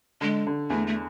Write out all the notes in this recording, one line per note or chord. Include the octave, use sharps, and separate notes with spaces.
D3 G#3
D3
E2 A3
A3